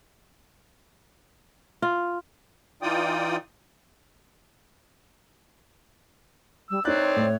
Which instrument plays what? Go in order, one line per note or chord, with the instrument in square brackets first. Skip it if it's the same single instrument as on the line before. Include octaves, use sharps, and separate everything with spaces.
[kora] F4
[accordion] E3 D#4 F4 D5 G5 D#6
[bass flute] G3 [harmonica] E6
[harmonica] C4 D5 [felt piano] D#4 F#6 [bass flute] C#5
[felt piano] A2